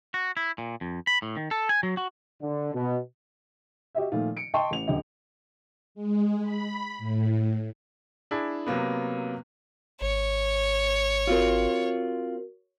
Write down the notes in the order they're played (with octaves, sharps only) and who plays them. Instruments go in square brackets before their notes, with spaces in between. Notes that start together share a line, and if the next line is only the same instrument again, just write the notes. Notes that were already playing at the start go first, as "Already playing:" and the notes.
[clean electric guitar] F#4
E4
A#2
F2
B5
A2
D#3
A4
G#5
F#3
F#4
[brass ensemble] D3
B2
[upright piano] F#4 G4 D#5 E5
A#2 D#3 F3 A3 F4
C#7 D7
D#5 G5 A5 C6 C#6
A1 F7
D#1 D3 G4 D#5
[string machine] G#3
B5
A2
[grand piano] D4 E4 G#4
C3 F#3 A#3 B3
[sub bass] G#1 [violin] C#5
[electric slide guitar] C4 F4 [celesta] F#4 A#4